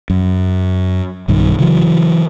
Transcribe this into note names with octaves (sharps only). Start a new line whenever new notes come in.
F#2
B1 G2 D#3
C#3 E3 F#3